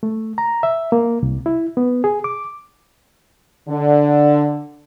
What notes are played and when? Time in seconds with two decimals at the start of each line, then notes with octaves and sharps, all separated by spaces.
0.03 A3
0.38 A#5
0.63 E5
0.92 A#3
1.23 C2
1.46 E4
1.77 B3
2.04 G#4
2.24 D6
3.69 D3